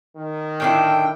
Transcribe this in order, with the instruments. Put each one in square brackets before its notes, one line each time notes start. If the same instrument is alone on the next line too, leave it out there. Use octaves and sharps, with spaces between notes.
[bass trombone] D#3
[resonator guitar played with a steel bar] A2 D3 E4 [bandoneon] G5